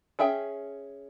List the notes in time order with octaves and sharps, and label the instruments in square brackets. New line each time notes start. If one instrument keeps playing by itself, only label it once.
[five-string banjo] C#4 G#4 E5 G5